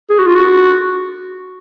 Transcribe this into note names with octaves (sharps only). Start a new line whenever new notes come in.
G#4
F#4
F4
F#4